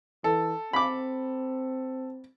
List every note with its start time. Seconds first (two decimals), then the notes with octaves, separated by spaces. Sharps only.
0.24 E3 A4
0.73 C4 B5 D6